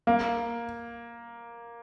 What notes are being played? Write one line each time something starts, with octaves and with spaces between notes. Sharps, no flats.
A#3